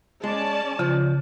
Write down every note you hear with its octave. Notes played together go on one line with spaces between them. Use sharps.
G#3 C#4 D5 A5
C#3 F3